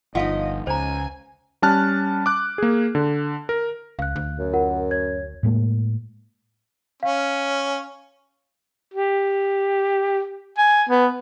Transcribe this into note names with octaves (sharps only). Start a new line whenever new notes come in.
G1 F3 D#4 D#5 F5 F#5
C#2 C5 G#5 A#5
G3 C#4 A5 F6 F#6
D6 F#6
A#3 G#4
D3
A#4
C#2 F5 F#6
D2
F#2
F4 A#4 F#5
C#5 G#6
A2 G#3 A#3
C#4 F5
G4
G#5
B3